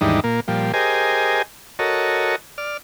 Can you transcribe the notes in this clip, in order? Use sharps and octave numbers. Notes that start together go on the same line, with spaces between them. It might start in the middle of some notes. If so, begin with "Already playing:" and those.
D#2 G#2 E3 G3 D4 D#4
A#2 A#3
A#2 F3 G3
G4 G#4 A#4 C5 D#5 G#5
F#4 A4 A#4 C#5 D#5
D5 F6